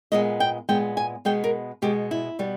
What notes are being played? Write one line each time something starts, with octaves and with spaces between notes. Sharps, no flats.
A#2 G#3 B3 D#5
G5
A#2 G#3 B3 G5
G#5
B2 G#3 B3 G5
A#4
B2 G#3 B3 G4
E4
B2 G3 B3